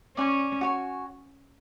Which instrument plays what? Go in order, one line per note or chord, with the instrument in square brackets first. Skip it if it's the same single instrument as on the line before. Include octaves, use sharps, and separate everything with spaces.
[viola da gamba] C#4 [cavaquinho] D5 G#5 C#6
[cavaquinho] F#4 C#5 G#5